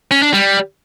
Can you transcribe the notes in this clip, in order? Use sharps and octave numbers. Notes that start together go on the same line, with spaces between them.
C#4
D4
G3